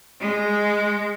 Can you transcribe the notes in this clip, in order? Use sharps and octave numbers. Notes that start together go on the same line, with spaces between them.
G#3